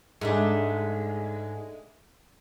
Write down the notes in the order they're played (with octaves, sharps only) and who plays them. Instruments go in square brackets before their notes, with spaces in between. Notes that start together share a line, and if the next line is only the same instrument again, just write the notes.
[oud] G#2 [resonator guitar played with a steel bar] G#3 A3 D4